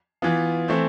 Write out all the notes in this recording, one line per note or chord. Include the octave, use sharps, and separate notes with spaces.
E3 B3 F4
E3 A3 C4